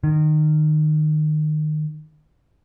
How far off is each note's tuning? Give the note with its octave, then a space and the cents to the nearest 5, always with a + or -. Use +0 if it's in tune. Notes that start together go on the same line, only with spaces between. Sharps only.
D#3 -25